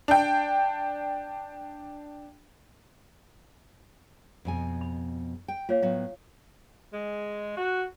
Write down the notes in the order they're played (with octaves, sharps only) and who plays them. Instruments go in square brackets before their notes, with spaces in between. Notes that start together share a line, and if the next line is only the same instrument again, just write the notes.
[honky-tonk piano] D4 G5
[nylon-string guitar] F2 B2 G#5
[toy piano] B5
[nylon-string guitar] G5
[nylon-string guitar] A#3 [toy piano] F4 C#5 F5
[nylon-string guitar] A2 F#3 B3 [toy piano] F5
[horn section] G#3
F#4